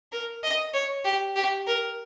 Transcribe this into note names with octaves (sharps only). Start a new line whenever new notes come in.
A#4
D#5
C#5
G4
G4
A#4